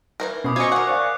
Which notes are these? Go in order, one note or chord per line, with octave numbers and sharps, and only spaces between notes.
E3 A#3 A#4
B2 C#4 B5 D6 D#6 C7
F4 F#4 C5 D#5 G#5 C#6
A#4 F#5
C5 D5 F5 F#6